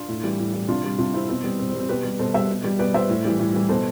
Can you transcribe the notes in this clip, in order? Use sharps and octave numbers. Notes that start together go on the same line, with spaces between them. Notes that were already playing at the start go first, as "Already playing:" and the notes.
Already playing: D4 F4
A2
E3 G3
A2
E3 G3
C3 D4 F4
G3
C3 D4 F4
G3 C4 E4
B2 C4
G3 B3
B2 C4
C4
G3
C4
B2 G4 B4
G3
B2 A4 C5
G3 C5 E5
B2
G3
B2 B4 D5
G3 C5 E5
A2
E3 G3
A2
E3 G3
B2 A4 C5